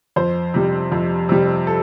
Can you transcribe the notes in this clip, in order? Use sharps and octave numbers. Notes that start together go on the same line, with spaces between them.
F2 C5
C3 G3
F2
C3 G3
A4